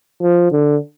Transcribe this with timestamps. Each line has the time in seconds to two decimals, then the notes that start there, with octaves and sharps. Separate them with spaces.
0.21 F3
0.51 D3